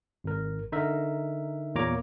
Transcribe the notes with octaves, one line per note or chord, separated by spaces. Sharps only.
G#1 A#4
D3 D#4 A#4 E5
E2 A#2 A#3 C#5 A#5 D6